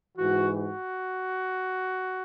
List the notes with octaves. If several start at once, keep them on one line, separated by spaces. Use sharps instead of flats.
G#2 E3 F#4
F#4